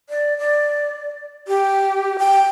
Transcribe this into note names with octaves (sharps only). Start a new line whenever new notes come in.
D5
D5
G4
G5